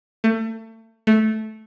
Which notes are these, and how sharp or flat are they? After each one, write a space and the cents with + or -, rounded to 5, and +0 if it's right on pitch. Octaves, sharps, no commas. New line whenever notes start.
A3 +30
A3 -10